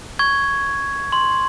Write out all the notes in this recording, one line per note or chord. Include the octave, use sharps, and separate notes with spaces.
C#6 G#6
C6